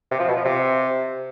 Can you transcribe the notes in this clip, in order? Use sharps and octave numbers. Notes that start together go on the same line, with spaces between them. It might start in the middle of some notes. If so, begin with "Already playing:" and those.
C3
F3
B2
F3
C3